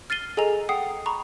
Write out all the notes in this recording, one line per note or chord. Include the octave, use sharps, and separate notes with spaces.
F6 A6 C7 D#7 G7
G#4 A4 D#5 G#5 A#5 F7
F#5 G5 D#6 C7
A#5 B5 C#6